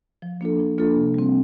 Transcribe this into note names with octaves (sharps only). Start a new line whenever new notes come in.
F3
A#3 D4 F4 A4
F3
A#3 D4 F4 A4
C3
G3 C4